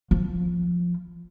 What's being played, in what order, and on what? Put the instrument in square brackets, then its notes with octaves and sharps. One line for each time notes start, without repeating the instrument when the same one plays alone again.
[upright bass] F3